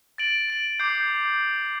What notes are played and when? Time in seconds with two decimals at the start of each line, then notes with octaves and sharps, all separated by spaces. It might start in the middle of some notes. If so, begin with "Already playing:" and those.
0.18 A6 D7 F#7
0.48 A6 D7 F#7
0.80 D6 G6 C7